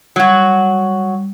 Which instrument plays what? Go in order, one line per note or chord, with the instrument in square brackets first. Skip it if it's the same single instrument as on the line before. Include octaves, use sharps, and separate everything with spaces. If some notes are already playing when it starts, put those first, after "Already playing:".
[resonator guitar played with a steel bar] F#3 F#4 [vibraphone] G3